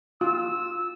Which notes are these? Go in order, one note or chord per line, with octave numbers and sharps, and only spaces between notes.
F4 E6